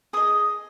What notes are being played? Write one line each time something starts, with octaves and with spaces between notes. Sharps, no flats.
G#4 D#5 D#6